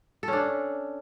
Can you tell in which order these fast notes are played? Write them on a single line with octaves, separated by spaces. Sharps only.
A4 C#4 D4